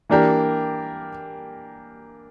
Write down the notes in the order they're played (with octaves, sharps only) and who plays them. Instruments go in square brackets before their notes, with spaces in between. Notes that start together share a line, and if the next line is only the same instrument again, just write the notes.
[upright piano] E3 A#3 D4 G4 A#4